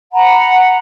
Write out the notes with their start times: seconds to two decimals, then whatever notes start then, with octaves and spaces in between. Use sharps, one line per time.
0.12 F#5 A#5 B5